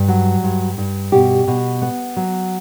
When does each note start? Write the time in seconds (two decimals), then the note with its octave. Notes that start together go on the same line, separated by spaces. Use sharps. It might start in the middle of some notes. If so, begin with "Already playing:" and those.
Already playing: G2
0.08 F#3
0.44 G2
0.78 G2
1.12 B2 G4
1.47 B2
1.82 B3
2.17 F#3